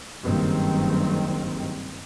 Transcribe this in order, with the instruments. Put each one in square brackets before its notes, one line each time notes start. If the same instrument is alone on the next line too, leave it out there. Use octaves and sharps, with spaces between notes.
[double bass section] F#1 G2 D#3 C4